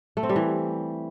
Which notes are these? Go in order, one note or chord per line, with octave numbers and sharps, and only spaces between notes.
A3
C4
G3
E3